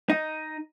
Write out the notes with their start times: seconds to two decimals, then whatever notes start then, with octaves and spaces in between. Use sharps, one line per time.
0.10 D#4